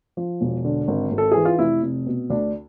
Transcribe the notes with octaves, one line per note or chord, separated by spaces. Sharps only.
F3
E1
D3
G#1
G#1
A4
E3 G#4
F4
F1 E4
F1
B2
D2 D4